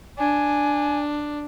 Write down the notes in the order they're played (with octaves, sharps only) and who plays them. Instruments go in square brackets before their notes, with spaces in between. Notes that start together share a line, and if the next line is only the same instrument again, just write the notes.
[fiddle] D4 [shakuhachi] G#5